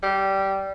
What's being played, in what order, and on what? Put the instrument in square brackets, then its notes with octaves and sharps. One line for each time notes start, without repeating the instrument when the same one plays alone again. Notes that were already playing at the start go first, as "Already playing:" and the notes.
[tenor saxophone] G3